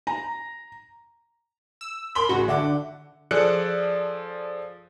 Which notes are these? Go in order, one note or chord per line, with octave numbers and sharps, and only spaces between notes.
A#5
E6
A#4 B5 C6 G7
A1 C#3 F#4
D3 E5 F#5 D6
F3 G#4 A4 D5 F#6 C#7